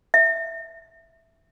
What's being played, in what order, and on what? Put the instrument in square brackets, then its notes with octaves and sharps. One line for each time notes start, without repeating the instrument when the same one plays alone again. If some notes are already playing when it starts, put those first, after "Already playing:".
[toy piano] E5